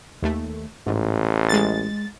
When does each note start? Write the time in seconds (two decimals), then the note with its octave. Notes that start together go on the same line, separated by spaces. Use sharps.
0.22 D#2 A3
0.87 A1 G#2
1.49 G#3 A6